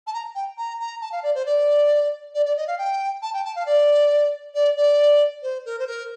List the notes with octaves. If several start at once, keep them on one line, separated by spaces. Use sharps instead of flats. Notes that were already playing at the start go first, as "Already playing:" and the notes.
A5
A#5
G5
A#5
A#5
A5
F5
D5
C5
D5
D5
D5
D#5
F5
G5
A5
G5
A5
F5
D5
D5
D5
C5
A#4
C5
A#4